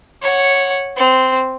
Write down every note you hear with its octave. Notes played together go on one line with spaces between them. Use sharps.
C#5 F#5
C4